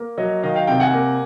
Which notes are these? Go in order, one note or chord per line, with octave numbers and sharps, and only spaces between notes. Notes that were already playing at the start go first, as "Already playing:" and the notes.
Already playing: A#3
F#3 C#5 D#5
D#3 D#5 F5
F5 G5
C3 F5 G5
F#5 G#5
A#3